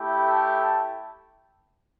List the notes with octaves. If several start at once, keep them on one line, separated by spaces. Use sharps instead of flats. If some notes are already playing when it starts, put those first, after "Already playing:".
Already playing: A3 E4 G4
A4
A4